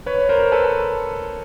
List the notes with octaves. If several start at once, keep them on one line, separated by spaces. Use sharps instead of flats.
B4 C#5
A#4 C5
A4 B4